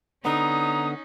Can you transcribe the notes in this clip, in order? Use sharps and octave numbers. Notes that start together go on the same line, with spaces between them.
D3 B3 C#4 D#4 A#5 D#6